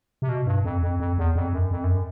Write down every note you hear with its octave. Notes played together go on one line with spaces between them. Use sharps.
C3
B2
G2
F2
F2
F2
E2
F2
F#2
F2
F#2